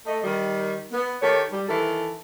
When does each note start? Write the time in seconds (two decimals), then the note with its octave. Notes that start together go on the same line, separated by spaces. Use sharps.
0.06 A3 D#5
0.24 D#3 G3
0.91 B3
1.22 D#3 G4 A4 C#5
1.51 G3
1.68 D#3 E3 A4